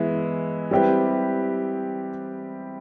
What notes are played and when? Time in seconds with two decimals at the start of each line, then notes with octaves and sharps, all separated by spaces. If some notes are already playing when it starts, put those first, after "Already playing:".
Already playing: E3 G#3 B3 E4
0.71 G3 C4 E4 G4 B4